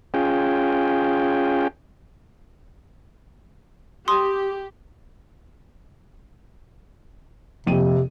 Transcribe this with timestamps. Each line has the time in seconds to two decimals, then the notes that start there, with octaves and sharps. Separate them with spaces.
0.14 C#4 F4 G#4 G5
4.08 G4 C6 D#6
7.67 A#1 F2 C3 D#7